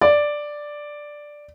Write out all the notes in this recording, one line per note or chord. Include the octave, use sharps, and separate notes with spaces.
D5